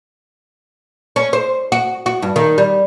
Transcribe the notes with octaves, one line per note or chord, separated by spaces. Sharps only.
C#4
C5
F#4
F#4
G2
D#3
G3